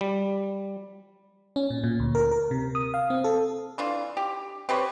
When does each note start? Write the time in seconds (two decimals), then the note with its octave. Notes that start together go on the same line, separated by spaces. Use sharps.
0.01 G3
1.56 C#4
1.70 A#2
1.84 A#2
2.00 D2
2.15 A#4
2.31 A#4
2.51 C3
2.75 D#6
2.94 F5
3.10 C4
3.24 A4
3.78 E3 D4 F4
4.17 G4
4.69 C4 G4 B4 C#5